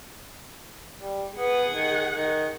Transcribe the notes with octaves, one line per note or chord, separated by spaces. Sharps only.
G3
B3 G#4 F#5
D#3
D#3